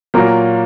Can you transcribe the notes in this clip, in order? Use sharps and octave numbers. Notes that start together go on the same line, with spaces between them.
A#2 F#3 A#3 F4 A#4